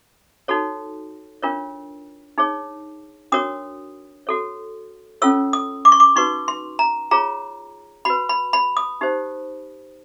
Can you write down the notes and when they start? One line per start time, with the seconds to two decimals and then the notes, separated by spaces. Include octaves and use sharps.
0.48 D#4 F#4 A4 C#5
1.42 D4 F4 A#4 C#5
2.38 D#4 G#4 C#5
3.32 D4 F#4 A#4 C#5 D#6
4.27 F#4 A4 C#5
5.22 C#4 F4 A4 C#5 E6
5.53 D#6
5.85 D6
5.92 C#6
6.00 D6
6.16 D#4 F#4 B4 C#6
6.48 C6
6.79 A#5
7.11 F4 G#4 C#5 A#5
8.05 F#4 B4 B5
8.29 B5
8.53 B5
8.77 D#6
9.01 D#4 G4 C5